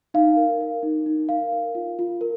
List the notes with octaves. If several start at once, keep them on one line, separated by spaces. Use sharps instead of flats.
D#4 F5
A#4
A#4
D#4
D#4
A#4 F5
A#4
F4
F4
A#4